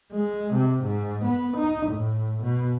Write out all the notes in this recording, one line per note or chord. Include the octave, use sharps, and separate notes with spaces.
G#3
C3
G#2
B3
D#4
A2
B2